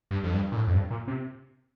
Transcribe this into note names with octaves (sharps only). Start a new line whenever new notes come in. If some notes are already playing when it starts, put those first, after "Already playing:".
G2
F2
G2
A#2
A2
F2
G2
A#2
C3